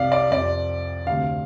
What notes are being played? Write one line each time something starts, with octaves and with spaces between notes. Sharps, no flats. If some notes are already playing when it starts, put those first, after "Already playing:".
Already playing: C2 C3 D5 F5
D5
F2 C3 D5
D2 C3 F5